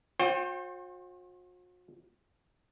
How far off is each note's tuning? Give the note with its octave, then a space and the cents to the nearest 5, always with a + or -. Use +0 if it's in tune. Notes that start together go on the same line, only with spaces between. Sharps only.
F#4 -45 C5 +40 G5 +0